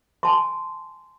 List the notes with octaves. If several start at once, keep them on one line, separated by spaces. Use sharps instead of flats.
G#5 A5 C6